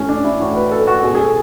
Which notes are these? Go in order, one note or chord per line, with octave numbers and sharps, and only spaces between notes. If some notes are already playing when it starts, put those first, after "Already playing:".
Already playing: A2 E3 A3 C#4
D4
E4
A2 E3 F#4
B4
A4
F#4
B2 G#4
G#4
A4